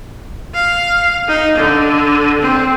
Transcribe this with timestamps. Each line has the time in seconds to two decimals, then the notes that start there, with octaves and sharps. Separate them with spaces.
0.55 F5
1.28 D#4
1.58 D3
2.41 C4